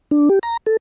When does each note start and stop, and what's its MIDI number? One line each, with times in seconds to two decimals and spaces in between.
0.11 0.29 62
0.29 0.39 67
0.43 0.57 82
0.66 0.77 69